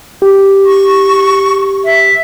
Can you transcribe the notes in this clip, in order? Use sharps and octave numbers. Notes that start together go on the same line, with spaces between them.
G4
C#6
E5